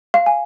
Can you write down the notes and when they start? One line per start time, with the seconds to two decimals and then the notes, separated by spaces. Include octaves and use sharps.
0.14 F5
0.26 G#5